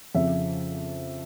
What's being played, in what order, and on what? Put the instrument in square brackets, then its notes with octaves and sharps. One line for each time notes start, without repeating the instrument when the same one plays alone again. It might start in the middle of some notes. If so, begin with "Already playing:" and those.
[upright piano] F2 C#3 F3 E5